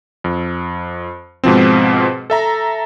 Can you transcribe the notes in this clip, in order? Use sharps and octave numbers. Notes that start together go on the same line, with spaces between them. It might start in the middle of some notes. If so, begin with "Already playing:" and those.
F2
G#2 B2 F3 C4
A4 E5 A#5